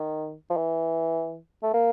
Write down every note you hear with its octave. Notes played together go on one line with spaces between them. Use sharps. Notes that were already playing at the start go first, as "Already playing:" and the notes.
Already playing: D#3
F3
E3
A3
A#3